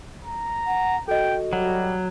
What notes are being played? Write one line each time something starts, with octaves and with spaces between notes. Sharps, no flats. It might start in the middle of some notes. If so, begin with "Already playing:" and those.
A#5
F#5
F#4 A4 D#5 G5
F#3 G3